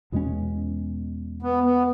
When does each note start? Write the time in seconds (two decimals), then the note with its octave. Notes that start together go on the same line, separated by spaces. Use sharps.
0.12 E2 B2 G#3 C#4
1.42 B3
1.63 B3